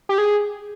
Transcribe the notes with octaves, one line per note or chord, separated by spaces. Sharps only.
G4
G#4